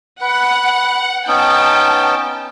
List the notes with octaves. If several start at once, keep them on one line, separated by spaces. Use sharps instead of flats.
B4 F#5
B3 C#4 D#4 G5 A5